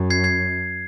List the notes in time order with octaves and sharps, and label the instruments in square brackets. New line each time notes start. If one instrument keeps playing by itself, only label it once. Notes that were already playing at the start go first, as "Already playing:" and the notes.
Already playing: [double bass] F#2
[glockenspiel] G#6 C7
G#6 C7